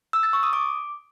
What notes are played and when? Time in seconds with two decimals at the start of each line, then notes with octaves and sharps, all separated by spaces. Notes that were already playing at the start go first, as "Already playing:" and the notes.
0.13 E6
0.23 A6
0.33 C#6
0.43 D#6
0.53 D6